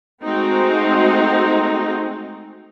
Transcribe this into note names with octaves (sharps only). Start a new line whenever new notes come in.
G#3 A3 C4 D#4 F#4